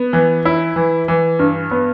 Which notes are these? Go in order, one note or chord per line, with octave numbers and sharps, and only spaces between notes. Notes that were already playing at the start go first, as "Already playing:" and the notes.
Already playing: B3
E3
E4
E3
E3
G2
B3